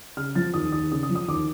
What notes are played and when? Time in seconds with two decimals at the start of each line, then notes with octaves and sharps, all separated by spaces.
0.17 C#3 F6
0.35 F3 A6
0.54 D#2 D#6
0.72 D#2 D#6
0.91 C#3 D#6
1.03 D#6
1.10 F3
1.15 D#6
1.28 D#2 D6